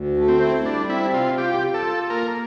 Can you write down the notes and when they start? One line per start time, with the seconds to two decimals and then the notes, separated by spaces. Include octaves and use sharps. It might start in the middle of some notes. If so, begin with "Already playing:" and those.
Already playing: D2
0.17 A3
0.28 C4
0.41 E4
0.65 G3 D4
0.89 C4 E4
1.13 C3 F4
1.38 F4 G4
1.62 F4
1.74 A4
1.86 F4
2.10 A#3 A#4